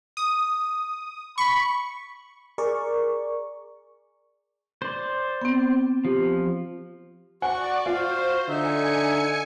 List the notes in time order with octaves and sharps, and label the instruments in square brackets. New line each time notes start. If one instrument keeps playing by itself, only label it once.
[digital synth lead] D#6
[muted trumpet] B5 [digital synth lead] C#6
[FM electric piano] G#4 A#4 D5 C#6
[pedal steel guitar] C5 D5
[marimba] B3 C4
[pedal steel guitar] F3 [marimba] G4
[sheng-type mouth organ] F#4 C#6 [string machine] D5 [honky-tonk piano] F#5
[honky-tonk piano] F4 [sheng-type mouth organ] F#4 F5 [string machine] C5
[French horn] D3 [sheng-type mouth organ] D#4 E5 [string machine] G#5 C#7